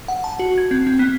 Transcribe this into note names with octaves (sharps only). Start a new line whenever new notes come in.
F#5
A5
F#4
G#6
C4
C4
B3